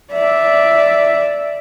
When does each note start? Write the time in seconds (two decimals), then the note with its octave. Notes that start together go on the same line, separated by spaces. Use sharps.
0.13 D5 E5